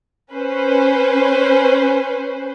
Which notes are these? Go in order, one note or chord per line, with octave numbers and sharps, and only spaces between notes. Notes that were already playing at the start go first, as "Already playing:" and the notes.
C#4 B4 C5